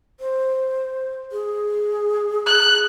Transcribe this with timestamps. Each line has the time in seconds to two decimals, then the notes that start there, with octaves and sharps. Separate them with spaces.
0.20 C5
1.32 G#4
2.46 F#6